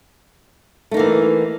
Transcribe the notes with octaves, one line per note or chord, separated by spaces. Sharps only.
E3 A3 A#3 D#4